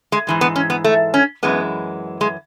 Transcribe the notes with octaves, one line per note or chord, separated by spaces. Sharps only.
G#3
G#2 E3 G#3
B3
C#4
B3
A3
C#4
F#2 E3 G#3 B3
G#3